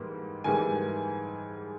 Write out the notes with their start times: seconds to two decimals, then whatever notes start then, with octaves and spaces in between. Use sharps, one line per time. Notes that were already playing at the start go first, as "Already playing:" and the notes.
Already playing: G#2 E3 G3 A#3
0.44 G#2 E3 G3 A#3 G#5